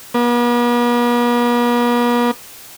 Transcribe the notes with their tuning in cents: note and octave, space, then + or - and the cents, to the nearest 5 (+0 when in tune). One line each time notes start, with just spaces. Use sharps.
B3 -45